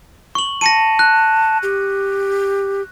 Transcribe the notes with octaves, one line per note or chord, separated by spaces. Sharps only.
C#6 F#7
A5 A#6 C#7 D#7
F#6
G4